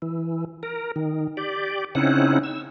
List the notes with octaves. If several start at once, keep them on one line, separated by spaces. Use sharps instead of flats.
E3
A#4
D#3
G4 D5
C#3 C4 C#4 D#4 E4 F#5
E6